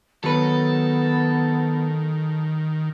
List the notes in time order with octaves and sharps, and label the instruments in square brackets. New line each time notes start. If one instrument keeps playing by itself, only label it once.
[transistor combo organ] D#3 [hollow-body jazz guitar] F#3 B4 [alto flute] B3 [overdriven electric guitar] A4